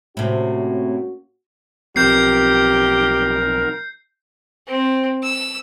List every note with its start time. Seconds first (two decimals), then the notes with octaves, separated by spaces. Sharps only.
0.17 A2 C3 A#3 C#4 F#4
1.96 B1 F3 C4 G4 A#4 G6 C7
4.67 C4
5.23 E6